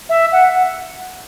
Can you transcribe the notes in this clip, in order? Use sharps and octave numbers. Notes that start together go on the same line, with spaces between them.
E5
F#5